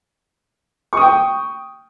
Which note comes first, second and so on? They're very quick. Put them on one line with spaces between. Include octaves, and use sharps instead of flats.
C#6 D#6 G5